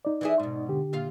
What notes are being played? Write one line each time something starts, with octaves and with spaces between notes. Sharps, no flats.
D#4 D5
E3 E4 G#4
G#2 B2
D3 G4
A#2 F4 F5